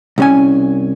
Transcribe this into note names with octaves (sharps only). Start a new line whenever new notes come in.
C2 C#4 G#5